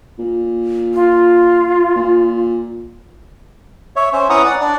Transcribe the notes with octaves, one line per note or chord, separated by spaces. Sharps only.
A#2
F4
A#2
C#5 E5
C#4 C5 E5
C#4 E4 B4 F#5 A#5 D#6
D5 F#5
D4 D5